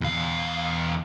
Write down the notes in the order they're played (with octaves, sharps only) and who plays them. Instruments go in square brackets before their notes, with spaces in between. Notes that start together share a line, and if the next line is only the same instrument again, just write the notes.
[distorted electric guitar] E2 F5